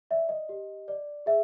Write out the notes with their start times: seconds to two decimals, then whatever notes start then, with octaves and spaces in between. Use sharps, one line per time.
0.11 D5 E5
0.29 D#5
0.49 G4
0.88 D5
1.26 G#4 E5